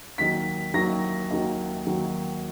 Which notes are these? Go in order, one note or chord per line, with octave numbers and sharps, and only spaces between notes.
D#2 D#3 F#3 B6
D#2 D#3 F#3 A#6
D#2 D#3 F#3
D#2 D#3 F#3